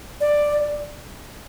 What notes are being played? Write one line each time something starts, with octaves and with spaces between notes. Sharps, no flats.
D5